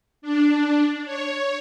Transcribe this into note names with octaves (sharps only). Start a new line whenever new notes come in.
D4
C#5